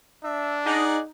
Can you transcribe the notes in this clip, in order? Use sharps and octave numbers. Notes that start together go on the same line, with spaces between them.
D4 E5
D#4 G#4 D5 F#5